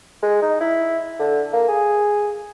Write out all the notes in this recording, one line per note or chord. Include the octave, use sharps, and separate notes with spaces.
G#3
D#4
E4
D3
A#3
G#4